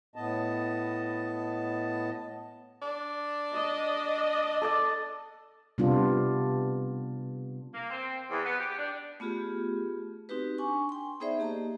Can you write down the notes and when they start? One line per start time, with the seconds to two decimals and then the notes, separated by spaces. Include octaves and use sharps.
0.16 A2 B3 D#5 A5
2.82 D4
3.54 D#5
4.62 A4 D5 A5
5.78 C3 G3 B3 D4 F4
7.74 A#3
7.90 C4
8.30 E2
8.45 B3
8.59 G4
8.78 D4
9.20 A3 B3 F4 G4 G#4
10.29 C4 D#4 F#4 G4 B4
10.58 D4 G#5 C#6
10.89 G5 C6
11.20 B3 D#4 G#4 C5 D5 E5
11.39 A#3 G4 D#5 A5 A#5